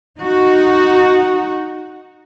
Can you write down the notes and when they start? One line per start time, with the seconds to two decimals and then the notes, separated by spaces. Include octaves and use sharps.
0.20 D#4 F#4